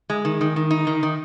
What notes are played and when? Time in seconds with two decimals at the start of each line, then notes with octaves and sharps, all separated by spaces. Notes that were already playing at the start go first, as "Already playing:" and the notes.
0.10 G#3
0.25 D#3
0.41 D#3
0.56 D#3
0.71 D#4
0.87 D#3
1.03 D#3